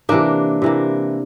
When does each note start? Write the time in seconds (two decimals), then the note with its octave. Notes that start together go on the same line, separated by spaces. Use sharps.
0.09 C3 E3 A#3 D4
0.62 C3 E3 A#3